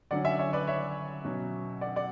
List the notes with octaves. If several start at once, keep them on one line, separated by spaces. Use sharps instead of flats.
D3 F#3 C#4 D5 F#5
E5 G#5
C#5 E5
B4 D5
C#5 E5
B2 F#3 C#4
D5 F#5
D5 F#5